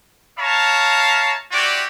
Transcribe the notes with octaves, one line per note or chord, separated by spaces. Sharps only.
C#5 E5 F5 A5 A#5
C4 E4 F#4 G4 D5